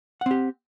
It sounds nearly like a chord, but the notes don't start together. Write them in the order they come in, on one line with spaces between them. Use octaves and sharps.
F#5 C4 G4